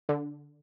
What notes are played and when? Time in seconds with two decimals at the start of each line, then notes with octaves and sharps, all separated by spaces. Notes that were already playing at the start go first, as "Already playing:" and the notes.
0.09 D3